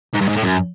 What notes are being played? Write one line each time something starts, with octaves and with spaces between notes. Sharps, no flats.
G#2
G2
G#2
A2
F#2